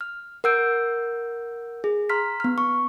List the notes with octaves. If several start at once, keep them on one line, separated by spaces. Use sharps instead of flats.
F6
A#4 F#5 E6 G6 D7
G#4
A#5 C6 F6 B6
B3 F6
C#6